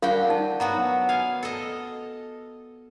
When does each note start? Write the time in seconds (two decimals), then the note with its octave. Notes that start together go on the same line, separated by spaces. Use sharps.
0.02 D4 F4 F#4 A#4 F5 G5
0.30 D#4 A5
0.60 F#3 B3 F#4 A#5
1.09 F5 G#5
1.43 A4 D#5